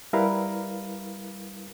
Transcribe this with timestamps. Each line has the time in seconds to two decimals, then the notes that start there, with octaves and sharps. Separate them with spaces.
0.13 G3 E4 A#4 B4 F5